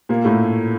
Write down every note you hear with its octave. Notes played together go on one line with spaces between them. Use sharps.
A#2 A#3
A2 A3